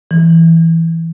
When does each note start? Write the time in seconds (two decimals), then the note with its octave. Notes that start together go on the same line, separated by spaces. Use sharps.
0.11 E3